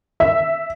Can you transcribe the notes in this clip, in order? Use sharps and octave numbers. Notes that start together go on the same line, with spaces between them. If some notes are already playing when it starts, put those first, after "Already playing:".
E5